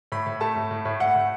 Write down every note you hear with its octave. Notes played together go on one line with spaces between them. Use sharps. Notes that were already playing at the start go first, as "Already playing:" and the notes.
A2 B5
A2
A3 A5
A2
A2
A2
A2 F#5
A2